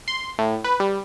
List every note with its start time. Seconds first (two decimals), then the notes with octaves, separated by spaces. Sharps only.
0.08 C6
0.39 A2
0.64 B4
0.80 G3